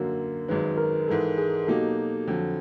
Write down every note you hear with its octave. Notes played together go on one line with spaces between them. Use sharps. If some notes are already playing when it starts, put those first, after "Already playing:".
Already playing: F#2 D3 F#3 A#3 A#4
G#1 F#2 D#3 G#3 B4
A#4
G#2 E3 G#3 A4
G#4
B2 F#3 A#3 D#4 G4 A4
F2 D3 F#3